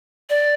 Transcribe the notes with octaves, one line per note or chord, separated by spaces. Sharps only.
D5